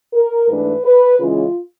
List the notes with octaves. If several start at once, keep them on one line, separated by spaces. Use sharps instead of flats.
A#4
G#2 E3 A3 D4 B4
B4
C#3 E3 G#3 C#4 F4